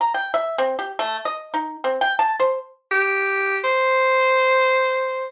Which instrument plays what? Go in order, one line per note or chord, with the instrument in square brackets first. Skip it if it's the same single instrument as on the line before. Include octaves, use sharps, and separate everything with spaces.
[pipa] A#5
G5
E5
C4
G4
A3
D#5
D#4
C4
G5
A5
C5
[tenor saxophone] G4
C5